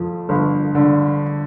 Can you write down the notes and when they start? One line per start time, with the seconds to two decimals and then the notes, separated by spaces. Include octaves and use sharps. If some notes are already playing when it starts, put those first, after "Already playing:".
Already playing: F2 F3
0.29 G1
0.75 D3